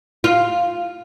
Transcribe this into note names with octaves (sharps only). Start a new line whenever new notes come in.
F4